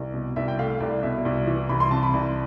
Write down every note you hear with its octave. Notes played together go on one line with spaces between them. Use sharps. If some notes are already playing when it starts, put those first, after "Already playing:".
Already playing: C2
B2
C2 E5
G5
A3 F5
F5
C2 D5
B2 E5
C2
E3
C2 B5
C6
C3 A5
B5
C2